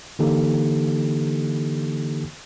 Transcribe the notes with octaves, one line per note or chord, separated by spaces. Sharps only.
D3 E3 A#3 D#4 G4 A4